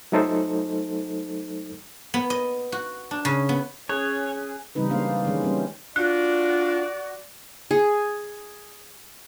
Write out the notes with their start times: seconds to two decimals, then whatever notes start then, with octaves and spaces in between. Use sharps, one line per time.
0.12 F#3 A3 D#4 A4 C5
2.14 B3
2.30 D#5
2.72 F#4
3.11 D4
3.25 C#3
3.49 B3
3.89 C#4 G#4 C#5 F#6
4.75 C#3 E3 G3 C4 D#4 B4
4.90 G#3 A#3 D4 C5 F5
5.25 D#3 E3 G#3 C#4
5.43 G3 C4 C#4
5.96 D4 F4 F#4 D5 F#6
7.71 G#4